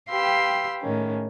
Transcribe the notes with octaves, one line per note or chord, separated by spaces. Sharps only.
G4 B4 F5 G5 C6 E6
A2 D#3 G#3 C#4